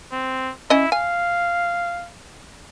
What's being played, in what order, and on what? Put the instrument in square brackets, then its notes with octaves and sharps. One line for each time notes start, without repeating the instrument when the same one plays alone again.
[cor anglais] C4
[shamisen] C#4 D#5 [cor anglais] E4
[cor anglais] F5 [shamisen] G#5